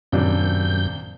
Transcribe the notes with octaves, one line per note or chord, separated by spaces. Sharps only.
D#1 F#2 C3 D4 G6